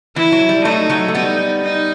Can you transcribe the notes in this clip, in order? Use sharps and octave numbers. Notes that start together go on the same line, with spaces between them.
E3 E4
F#3
G3
F#3 A3 D#4
F#3 A3
A3
G3 B3 D#4
D#4